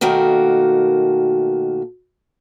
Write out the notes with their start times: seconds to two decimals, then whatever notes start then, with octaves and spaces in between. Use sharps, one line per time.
0.01 B2 D#3 A3 A#3 F#4